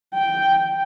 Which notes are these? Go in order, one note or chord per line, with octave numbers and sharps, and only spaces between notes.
G5